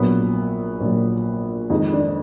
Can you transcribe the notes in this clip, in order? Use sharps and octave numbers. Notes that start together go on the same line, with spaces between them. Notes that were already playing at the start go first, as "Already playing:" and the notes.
Already playing: A#1 A#2 F#3 B3
A#1 A#2 F#3
F2 D#3 G#3 D#4
D4